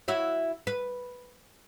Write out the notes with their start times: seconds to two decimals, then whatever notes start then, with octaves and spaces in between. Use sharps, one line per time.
0.08 E4 F#4 C#5
0.67 B4